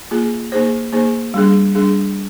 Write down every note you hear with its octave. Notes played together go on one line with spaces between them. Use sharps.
A#3 F4 G#4
A#3 D#4 G#4 C5
A#3 D#4 G#4 C5
G3 D4 G#4
G3 D4 G#4